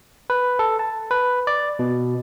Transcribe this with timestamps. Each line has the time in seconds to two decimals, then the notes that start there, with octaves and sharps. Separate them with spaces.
0.30 B4
0.59 A4
0.79 A5
1.11 B4
1.47 D5
1.79 B2